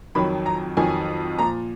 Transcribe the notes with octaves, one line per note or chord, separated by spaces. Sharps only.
F2 D#3 F#3 B5
A#5
F2 D#3 F#3 G#5
A#2 F3 A#5